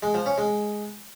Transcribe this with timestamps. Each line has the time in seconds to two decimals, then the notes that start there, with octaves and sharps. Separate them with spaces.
0.03 G#3
0.14 F3
0.26 C#4
0.38 G#3